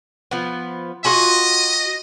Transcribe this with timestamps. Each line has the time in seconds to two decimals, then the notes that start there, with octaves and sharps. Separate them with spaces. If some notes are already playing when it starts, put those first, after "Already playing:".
0.31 F3 B3
1.05 F4 F#4 D#5 G#5